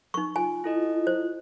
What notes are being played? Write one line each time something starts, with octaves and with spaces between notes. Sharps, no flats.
D#4 C#6
F4 G#5
E4 A4 D#5
C5